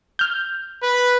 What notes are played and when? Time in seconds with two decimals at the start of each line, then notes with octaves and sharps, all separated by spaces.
0.19 F6 G6
0.82 B4